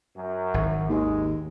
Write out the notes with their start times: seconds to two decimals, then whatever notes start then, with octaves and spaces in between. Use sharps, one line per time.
0.16 F#2
0.54 G#1 D#3
0.89 D#2 G#3